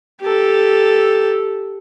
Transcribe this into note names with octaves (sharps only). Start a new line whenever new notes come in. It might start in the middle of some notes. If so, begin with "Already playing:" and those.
G4 A4